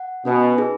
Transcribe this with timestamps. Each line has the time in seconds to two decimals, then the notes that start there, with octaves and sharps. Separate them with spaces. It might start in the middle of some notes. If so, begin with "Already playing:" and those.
Already playing: F#5
0.25 B2 C#4 B4 D#5 G#5
0.58 D#4 G#4 B4